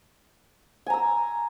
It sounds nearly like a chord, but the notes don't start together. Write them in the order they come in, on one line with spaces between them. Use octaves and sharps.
G#5 A#5 E6